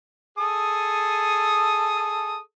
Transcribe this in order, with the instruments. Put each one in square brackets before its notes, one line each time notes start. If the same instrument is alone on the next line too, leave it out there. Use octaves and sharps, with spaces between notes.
[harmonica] G#4 A4 D#6